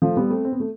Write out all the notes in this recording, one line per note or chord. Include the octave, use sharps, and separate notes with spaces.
F3 A3
G3 B3
A3 C4
C4
B3
A3